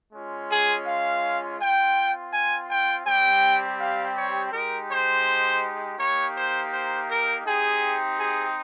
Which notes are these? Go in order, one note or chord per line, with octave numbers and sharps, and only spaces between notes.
G#3 C#4 F4
G#4
F5
C4 F4 G5
G#5
G5
G3 C4 G4 G5
F5
C#5
G#3 D#4 G4 A#4
C5
A#3 D#4 G4 C#5
C5
C5
A#4
C4 D#4 G4 G#4
G#4